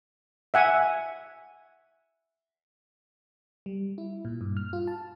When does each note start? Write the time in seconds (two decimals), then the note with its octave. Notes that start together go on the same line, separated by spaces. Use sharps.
0.54 E5 F#5 G#5
3.66 G3
3.98 E4
4.25 A#2
4.41 G2
4.57 F6
4.73 F4
4.87 A5